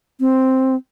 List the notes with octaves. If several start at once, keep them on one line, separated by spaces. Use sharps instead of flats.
C4